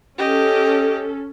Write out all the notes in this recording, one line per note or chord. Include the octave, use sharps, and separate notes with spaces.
C#4 G4 A4 D#5